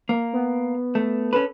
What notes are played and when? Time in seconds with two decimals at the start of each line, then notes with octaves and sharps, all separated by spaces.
0.09 A#3
0.33 B3
0.95 A3
1.33 C#4 A4 B4